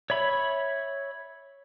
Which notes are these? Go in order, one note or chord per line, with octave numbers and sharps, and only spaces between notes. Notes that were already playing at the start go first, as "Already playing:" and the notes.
C#5 E5 B5